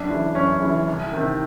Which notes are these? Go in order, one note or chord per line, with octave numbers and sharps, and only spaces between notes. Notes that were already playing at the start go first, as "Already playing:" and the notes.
Already playing: F#2 D4
C#3 E3
F#2 C#4
C#3 E3
C2
C3 D#3